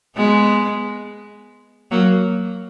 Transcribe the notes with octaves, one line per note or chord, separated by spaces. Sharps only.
G#3 B3
F#3 A#3